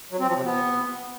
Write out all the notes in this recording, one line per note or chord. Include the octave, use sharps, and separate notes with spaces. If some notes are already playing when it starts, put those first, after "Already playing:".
F#3
C4
F3
C3
B3